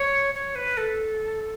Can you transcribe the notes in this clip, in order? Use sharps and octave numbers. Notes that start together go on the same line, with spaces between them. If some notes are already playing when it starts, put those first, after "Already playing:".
Already playing: C#5
C#5
B4
A4